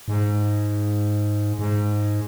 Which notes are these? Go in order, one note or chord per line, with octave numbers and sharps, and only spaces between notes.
G#2
G#2